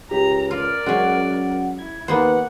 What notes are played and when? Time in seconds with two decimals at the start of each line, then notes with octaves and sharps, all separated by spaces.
0.11 C#2 G4 A#5
0.51 F4 A#4 D5 F6
0.86 F#2 G#3 C#4 F#5
1.79 E4 G#6
2.08 D#2 A#3 B3 B4 C5 F#5